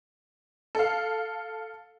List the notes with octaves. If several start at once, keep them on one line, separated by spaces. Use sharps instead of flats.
A4 F5